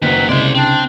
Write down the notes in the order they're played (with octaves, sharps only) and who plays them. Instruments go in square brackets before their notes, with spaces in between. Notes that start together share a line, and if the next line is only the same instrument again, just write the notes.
[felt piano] F#1 [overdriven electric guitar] D#3 F#3 [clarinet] B4
[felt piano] C2 C#3 [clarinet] G#3 [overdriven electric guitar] C5 D5
[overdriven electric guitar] C4 [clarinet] D4